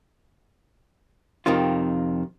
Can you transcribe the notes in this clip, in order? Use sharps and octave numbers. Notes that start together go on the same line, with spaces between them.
F2 C3 D#3 C4 F4